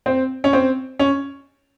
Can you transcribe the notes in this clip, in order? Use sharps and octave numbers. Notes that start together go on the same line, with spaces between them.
C4
C#4
C4
C#4